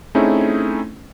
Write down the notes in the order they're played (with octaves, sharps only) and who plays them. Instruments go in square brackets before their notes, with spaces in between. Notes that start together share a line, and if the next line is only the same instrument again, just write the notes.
[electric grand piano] A3 C4 C#4 D#4 E4 G#4